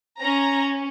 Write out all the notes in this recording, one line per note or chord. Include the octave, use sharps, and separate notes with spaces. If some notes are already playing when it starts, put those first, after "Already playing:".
C#4 A#5